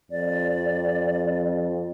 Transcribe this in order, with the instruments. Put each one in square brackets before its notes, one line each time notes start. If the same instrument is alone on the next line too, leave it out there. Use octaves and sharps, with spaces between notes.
[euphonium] F2 [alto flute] D5